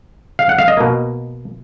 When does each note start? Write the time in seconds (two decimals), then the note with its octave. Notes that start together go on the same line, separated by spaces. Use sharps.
0.39 F5
0.49 F#5
0.59 F5
0.68 D#5
0.77 B2 A#3